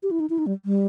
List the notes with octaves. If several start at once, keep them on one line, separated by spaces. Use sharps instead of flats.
G4
E4
D#4
E4
D#4
G3
G3